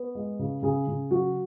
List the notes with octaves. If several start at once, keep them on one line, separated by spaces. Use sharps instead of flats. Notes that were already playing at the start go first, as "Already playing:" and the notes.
Already playing: B3 B4
G#3
C#3
C#3 G#4
C#3
F#3 F#4